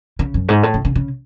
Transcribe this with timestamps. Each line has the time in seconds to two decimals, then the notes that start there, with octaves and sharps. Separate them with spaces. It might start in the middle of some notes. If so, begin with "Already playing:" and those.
0.19 C#3
0.34 F#2
0.48 G#2
0.63 A2
0.74 C#3
0.85 C#3
0.95 C#3